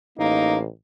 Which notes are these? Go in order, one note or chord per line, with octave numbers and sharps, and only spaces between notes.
A1 A#3 D#4